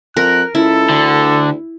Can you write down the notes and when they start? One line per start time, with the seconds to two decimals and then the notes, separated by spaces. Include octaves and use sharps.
0.17 F2 A#4 F#6
0.55 C#2 E4 A4
0.89 D2 D3